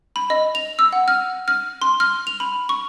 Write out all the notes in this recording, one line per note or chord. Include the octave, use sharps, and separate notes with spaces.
B5
D#5
F7
E6
F#5
F6
F6
C6
F6
F7
B5
C#6